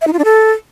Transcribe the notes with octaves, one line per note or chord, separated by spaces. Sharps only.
E5
D#4
F4
D4
A4